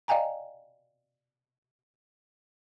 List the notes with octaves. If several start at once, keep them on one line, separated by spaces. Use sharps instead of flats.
D5 D#5 F5 G5 G#5 A#5